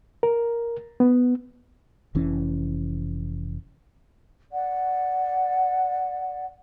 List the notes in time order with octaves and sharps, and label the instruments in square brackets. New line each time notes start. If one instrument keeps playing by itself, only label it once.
[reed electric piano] A#4
B3
[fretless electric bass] F1 E3 C#4
[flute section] D5 F#5